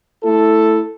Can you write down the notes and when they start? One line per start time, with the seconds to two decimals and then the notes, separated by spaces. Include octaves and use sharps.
0.23 A3 E4 A4